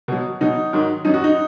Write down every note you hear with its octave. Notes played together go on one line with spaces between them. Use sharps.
B2 F#3
B2 F#3 D#4
G#2 D#3 F#3
F#2 F#3 D#4
F#4
D#4